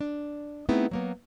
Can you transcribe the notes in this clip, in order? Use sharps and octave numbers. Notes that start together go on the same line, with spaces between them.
D4
A3 B3 C4 D#4 E4 G#4
F#3 A#3 B3